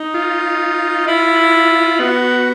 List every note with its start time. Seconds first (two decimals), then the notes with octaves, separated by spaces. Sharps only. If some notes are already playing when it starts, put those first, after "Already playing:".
Already playing: D#4
0.14 F4
1.07 E4
2.00 B3 F#4